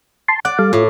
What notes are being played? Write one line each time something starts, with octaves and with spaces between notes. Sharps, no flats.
A5 C6
D5 F#5
G3 A4 F5
A2 F4